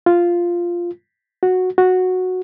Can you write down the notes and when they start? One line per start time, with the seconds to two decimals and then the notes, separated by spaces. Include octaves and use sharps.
0.06 F4
1.43 F#4
1.78 F#4